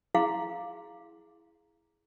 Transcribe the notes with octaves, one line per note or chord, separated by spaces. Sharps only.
E4 G#4 F5 C6